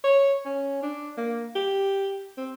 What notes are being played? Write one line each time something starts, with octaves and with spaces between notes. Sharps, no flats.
C#5
C#4
D4
A#3
G4
C4